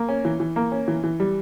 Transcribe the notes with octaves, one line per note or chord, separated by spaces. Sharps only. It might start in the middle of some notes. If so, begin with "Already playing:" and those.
Already playing: A#3
C#4
E3
E3
A#3
C#4
E3
E3
G3